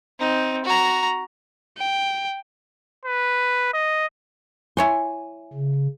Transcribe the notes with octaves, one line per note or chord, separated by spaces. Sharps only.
C4 D#4
F#4 A#5
G5
B4
D#5
E4 C#5 G#5 C6
C#3